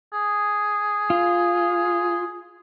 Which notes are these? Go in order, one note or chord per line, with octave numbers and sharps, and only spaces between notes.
G#4
F4